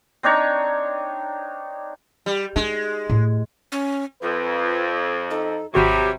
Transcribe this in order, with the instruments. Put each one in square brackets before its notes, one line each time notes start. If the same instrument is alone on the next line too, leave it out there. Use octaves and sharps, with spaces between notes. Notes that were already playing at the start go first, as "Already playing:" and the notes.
[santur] C4 D4 D#4 C#5
[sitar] G3
[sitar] G#3 [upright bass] D#4
[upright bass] A2
[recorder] C#4
[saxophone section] F2 [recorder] F4 [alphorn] B4
[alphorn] D#4 [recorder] A4
[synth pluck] G#1 F#4 C6 [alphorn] C3 [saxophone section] F#3 G3 [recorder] G4